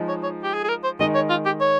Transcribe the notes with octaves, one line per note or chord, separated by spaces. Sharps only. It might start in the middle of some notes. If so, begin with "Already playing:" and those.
Already playing: F3 G#3 D#4
C#5
C#5
G4
G#4
G#4
A#4
C5
D#3 G#3 D#4 D#5
C#5
F4
G4
C#5